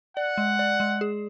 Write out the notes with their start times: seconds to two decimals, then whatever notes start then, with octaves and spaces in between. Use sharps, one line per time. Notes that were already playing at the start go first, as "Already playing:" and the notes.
0.17 D5 F#5
0.38 G#3
0.59 D5
0.80 G#3
1.01 G#4